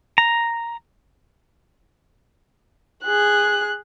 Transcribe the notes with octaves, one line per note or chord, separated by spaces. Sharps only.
A#5
G#4 F#6